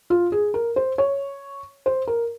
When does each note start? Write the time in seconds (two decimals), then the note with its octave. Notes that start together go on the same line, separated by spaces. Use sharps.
0.10 F4
0.32 G#4
0.54 A#4
0.76 C5
0.98 C#5
1.86 C5
2.07 A#4